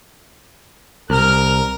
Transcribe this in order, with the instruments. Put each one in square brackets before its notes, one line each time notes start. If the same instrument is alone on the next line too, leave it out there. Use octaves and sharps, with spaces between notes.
[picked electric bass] C2 [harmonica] A#4 [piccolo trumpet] F6